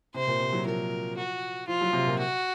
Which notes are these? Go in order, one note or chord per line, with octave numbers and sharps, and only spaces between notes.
C3 C5
A#2
C3
F#3
F3 A#4
F#4
F3 F4
F#3
C3
A#2
F#4